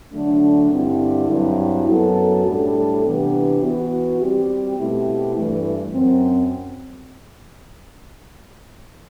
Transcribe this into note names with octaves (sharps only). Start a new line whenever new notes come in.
D3 F#3 A3 D4
G2 D3 G3 C4 E4
G2 F#3 C4 E4
F#2 F#3 B3 F#4 A4
A2 G3 D4 A4
C3 E3 B3 D4 G4
E3 B3 F#4
G3 C4 G4
B2 A3 C4 E4 G4
G2 E3 A3
F#2 F#3 C4